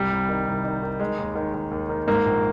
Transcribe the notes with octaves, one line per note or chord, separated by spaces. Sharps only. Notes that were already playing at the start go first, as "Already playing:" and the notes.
Already playing: C2 G3
C2
D#3
C2
D#3
D#3
D#3 G#3
D#2
D#3
D#3
D#2
D#3
G#2 A#3
A#1